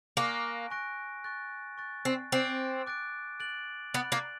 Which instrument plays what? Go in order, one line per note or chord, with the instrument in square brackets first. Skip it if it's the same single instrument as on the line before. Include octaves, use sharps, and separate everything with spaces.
[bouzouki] A#3 [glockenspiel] G#5 C#6 F#6 A#6 D7
[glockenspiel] G#5 C#6 F#6 A#6 D7
C#6 F#6 A6
C#6 F#6 A6
[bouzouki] C4
[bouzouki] C4 [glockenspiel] D6 F#6 A6 D7
[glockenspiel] D6 F#6 A6 D7
F#6 A6 D7 F#7
[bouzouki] B3 [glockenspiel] F#6 A6 D7 F#7
[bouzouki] A#3